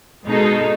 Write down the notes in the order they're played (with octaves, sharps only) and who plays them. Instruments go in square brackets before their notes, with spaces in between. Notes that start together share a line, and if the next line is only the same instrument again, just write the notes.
[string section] B2 G#3 D#4 A4